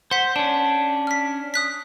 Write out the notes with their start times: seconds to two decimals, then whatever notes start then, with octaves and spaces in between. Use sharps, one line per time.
0.11 C5 F#5 B6
0.36 C#4 D4 A5
1.07 F6 B6
1.54 D#6 F#6 B6